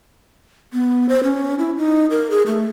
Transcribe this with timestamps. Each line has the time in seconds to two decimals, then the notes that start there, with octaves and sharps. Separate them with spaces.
0.73 B3
1.09 C5
1.24 C#4
1.59 E4
1.77 D#4
2.11 A#4
2.31 G#4
2.47 A3